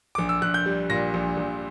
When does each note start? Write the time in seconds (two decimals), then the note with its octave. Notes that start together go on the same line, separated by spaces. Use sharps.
0.15 A#1 D6
0.29 E6
0.42 A#1 F#6
0.54 G6
0.66 G3
0.90 A#2 A#6
1.14 A#1
1.37 A#1